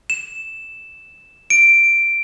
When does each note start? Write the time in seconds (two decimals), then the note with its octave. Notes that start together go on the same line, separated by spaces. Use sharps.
0.10 E7
1.50 D7